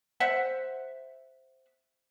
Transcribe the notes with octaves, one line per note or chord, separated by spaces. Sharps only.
C5 E5 F#5